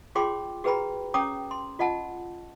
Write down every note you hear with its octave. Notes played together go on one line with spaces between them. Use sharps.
F4 G#4 C#5 G5 C6 D6
F#4 G#4 B4 G5 A#5 B5
C#4 C#5 G5 A#5 D6 D#6
C6
F4 D#5 F#5 A5